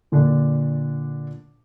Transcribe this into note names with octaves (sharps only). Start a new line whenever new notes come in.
A#2 D3 D4